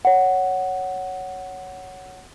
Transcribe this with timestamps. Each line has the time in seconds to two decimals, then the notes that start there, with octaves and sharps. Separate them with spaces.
0.05 C#5 F#5